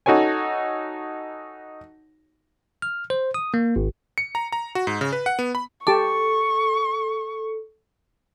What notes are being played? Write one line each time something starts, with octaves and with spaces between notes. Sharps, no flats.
D#4 F#4 A4 C#5 G#5
F6
C5
D#6
A#3
G#1
C#7
A#5
A#5
F#4
G#2
C#3
B4
F#5
B3
B5
G4 A4 A5 C#6 D6